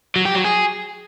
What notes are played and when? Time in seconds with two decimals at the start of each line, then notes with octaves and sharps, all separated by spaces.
0.16 F#3
0.25 G4
0.35 F#3
0.44 G#4